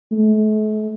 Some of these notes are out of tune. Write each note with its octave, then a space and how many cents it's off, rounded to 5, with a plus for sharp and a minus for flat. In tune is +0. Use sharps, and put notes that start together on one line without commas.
A3 -40